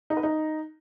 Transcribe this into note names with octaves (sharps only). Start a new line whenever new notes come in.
D#4
B4
D#4